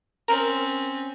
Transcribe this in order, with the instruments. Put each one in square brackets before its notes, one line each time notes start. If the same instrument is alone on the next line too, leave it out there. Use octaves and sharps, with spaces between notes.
[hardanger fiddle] C4 C#4 [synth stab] A#4